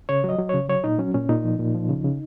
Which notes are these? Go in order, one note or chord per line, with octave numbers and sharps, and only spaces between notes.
C#3 C#5
F#3 D#5
F#3
C#3 C#5
F#3 C#5
A#2 D#4
F#3 C#4
A#2 C#4
A#2 D#4
F3
A#2
F3
C#3
C#3